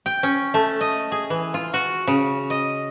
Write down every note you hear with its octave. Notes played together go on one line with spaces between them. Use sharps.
G5
C#4
A3
D#5
G#4
E3
F4
F#4
C#3
D#5